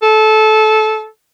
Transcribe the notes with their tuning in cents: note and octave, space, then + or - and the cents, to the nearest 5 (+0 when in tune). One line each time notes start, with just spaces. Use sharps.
A4 -20